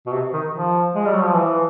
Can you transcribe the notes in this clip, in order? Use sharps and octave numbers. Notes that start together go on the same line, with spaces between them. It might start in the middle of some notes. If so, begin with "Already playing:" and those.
B2
C3
D#3
F3
G#3
G3
F#3
F3
E3